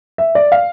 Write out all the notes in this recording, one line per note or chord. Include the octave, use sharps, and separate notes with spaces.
E5
D5
F5